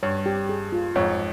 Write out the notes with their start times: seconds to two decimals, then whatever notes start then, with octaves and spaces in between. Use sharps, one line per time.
0.03 G2 C#5
0.26 G4
0.49 G#4
0.72 F4
0.95 F2 G#2 C#5